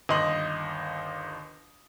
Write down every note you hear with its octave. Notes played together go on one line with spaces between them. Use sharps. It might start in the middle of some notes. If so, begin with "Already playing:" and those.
G1 D#2 D#5 C6 F#7